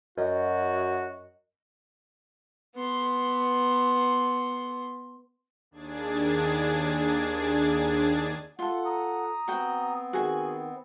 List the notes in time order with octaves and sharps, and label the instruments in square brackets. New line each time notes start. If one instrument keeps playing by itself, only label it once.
[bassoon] F#2 [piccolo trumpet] F#4 [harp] D#5
[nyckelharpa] B3 C6
[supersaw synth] D#2 D4 G#4 G#6 A6
[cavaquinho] F4 A4 [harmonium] F#5
[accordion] A#5 D#6
[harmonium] B3 C4 [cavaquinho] F#4 G5
[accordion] D#3 [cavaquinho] F#4 G#4 G#5